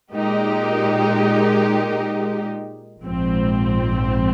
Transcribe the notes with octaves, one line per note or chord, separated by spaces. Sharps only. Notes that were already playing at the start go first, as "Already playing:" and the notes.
A#2 G#3 D#4 G4 A#4
A#1 G#2 F3 C4